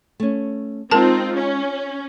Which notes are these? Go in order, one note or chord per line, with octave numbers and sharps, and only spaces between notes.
A3 C#4
G#3 C4 D#4 F4 A#4 A5
C#4